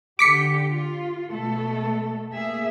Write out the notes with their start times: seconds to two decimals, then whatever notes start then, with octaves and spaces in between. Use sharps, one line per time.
0.19 D3 G4 D6 B6 C#7
0.70 F4
1.31 B2 A3 A4
2.33 A#3 G#4 E5